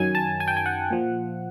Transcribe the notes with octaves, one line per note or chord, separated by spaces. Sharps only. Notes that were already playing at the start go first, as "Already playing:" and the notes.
Already playing: F#2 D#3 F#3 G#5
A5
G#5
G5
G#5
F#5
A#2 F3